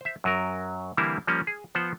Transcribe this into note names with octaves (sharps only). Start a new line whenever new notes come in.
C5 E5
F#2 F#3 A#4
D3 E3 G3 A#3 C4 E4
F3 G3 A#3 C#4
G#4
F3 B3 C5 F#5